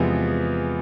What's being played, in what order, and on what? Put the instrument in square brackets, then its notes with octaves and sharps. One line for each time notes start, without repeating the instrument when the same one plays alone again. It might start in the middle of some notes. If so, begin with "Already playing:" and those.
Already playing: [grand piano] E2 C3 F3 G#3 B3